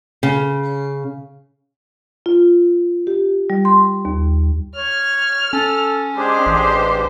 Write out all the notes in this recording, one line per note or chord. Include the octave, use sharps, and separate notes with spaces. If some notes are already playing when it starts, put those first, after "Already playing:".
C#3
F4
G4
G3
C6
D#2
C#5 F6
C#4 A4
G#3 D4 G4 G#4 C5
A1